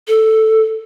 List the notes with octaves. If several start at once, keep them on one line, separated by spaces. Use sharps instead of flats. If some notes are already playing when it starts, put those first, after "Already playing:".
A4